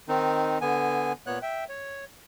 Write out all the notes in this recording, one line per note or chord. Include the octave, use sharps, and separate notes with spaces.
D#3 C4 D#4
D3 B3 G#5
A#2 B3 C#5 F#6
E5 G5
C#5